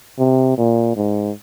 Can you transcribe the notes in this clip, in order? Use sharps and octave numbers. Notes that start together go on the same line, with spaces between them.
C3
A#2
G#2